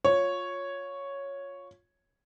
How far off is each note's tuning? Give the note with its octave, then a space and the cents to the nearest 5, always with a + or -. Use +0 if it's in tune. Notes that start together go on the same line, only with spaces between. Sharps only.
F4 +20 C#5 +0